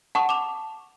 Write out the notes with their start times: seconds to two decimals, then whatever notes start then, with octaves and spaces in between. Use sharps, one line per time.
0.15 F#5 A5 B5 C#6 D#6
0.29 D6 E7 F7